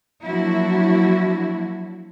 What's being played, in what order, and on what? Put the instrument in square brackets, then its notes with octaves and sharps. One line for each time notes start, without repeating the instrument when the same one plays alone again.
[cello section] F3 F#3 A#3 D4 E4 F#4